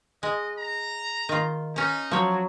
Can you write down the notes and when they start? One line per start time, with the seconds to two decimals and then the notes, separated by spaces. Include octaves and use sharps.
0.23 G#3 D#5
0.58 A#5
1.29 D#3 F4
1.76 C#4 D#4 A#5
2.11 F3 F#3 C#5